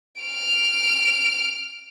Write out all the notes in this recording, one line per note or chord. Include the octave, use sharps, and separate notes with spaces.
F6 D7